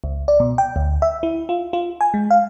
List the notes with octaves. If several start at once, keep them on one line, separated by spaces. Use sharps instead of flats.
C#2
D5
B2
G5
D2
E5
E4
F4
F4
G#5
G#3
F5